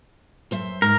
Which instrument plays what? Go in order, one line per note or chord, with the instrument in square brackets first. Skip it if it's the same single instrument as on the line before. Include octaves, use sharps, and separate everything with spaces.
[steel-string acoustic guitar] F#2 C5 E5
[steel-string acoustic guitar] G#2 [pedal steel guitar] A#4